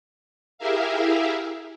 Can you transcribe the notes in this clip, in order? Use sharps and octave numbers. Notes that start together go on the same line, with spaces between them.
E4 G4 G#4 A#4 E5 F5